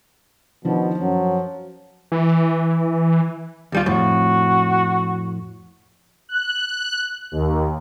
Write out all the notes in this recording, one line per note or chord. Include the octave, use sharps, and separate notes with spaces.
B2 D#3 F3 D4 E4
F#2 F#3
E3
D#2 G3 F4
F2 A2 F#4
F#6
D#2